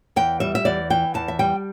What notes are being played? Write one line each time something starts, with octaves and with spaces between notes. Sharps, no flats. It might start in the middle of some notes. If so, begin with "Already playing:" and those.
E2 G5
G3 E5
E5
E2 D5
E3 G5
E2 A5
E5
G3 G5